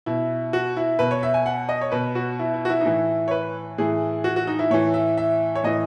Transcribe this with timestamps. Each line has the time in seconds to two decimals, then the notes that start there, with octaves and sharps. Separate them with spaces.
0.06 B2 E4
0.53 F#4
0.77 E4
0.99 B2 B4
1.11 C#5
1.23 E5
1.34 G#5
1.46 F#5
1.69 D#5
1.81 C#5
1.92 B2 B4
2.15 F#4
2.39 E4
2.54 E4
2.65 F#4
2.70 E4
2.81 D#4
2.85 A2 E3 E4
3.28 C#5
3.31 B4
3.78 A2 E3 G#4
4.24 F#4
4.36 F#4
4.47 D#4
4.59 E4
4.71 A2 E3 C#5
4.94 E5
5.17 E5
5.55 C#5
5.64 A2 E3 D#5